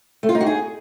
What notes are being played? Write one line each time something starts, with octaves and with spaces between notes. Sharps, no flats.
A3
F4
D#4
F#4
G#4